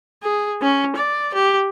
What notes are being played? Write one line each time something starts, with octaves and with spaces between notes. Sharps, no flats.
G#4
C#4
D5
G4